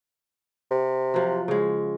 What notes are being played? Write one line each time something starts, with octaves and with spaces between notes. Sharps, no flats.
C3
F3 F#3
C#3 G#3